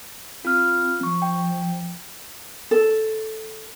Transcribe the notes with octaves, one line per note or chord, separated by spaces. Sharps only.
C4 F4 F6
F3 C#6
G5
A4